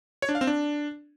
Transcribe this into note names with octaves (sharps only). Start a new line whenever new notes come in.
C#5
D4
F5
C4
D4